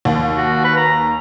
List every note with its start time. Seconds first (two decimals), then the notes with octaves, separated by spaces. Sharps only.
0.05 D#2
0.37 F#4
0.64 B4
0.77 A#5